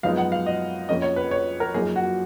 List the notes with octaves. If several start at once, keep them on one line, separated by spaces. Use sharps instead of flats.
F#2 F3 G#3 B3 D#4 F5
F#5
F5
D#5
F2 F3 A#3 C#4 D#5
C#5
B4
C#5
A#4
F#2 F3 A#3 D#4 G#4
F#4